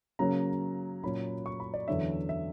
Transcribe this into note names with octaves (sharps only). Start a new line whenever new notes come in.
C#3 F#3 A#3 C#4 A#5
A#2 F#3 C#4 B5
C#6
B5
D5
E2 D3 F#3 C#4 E5
E5